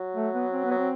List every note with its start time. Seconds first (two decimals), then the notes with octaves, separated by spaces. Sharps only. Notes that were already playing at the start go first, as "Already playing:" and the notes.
Already playing: F#3
0.16 A3
0.34 B3
0.52 C4
0.65 B3
0.71 F#3
0.78 C4